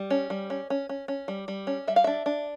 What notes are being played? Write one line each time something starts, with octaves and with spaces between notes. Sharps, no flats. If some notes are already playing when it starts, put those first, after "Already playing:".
Already playing: G3
C#4
G3
C#4
C#4
C#4
C#4
G3
G3
C#4
G3 E5
F5
D4 E5
D4